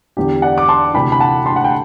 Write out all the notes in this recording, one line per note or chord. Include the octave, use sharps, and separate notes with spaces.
E2 D3 G4
D5 F#5
D6
A5 C6
D2 C3 E3 G5 B5
B5
F#5 A5
A5 C6
F#5
G5